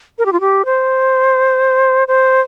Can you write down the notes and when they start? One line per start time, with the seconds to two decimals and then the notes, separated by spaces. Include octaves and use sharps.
0.18 A#4
0.26 G4
0.33 F4
0.40 G4
0.65 C5
2.08 C5